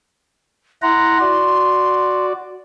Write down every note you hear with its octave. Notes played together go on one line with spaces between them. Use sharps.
E4 F#5 A#5 C6
F#4 D5